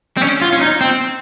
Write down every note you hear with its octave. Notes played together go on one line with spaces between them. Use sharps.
C4
C#4
F4
C#4
D#4
C4